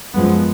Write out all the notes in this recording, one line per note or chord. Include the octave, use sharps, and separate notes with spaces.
F#2 F3 G#3 B3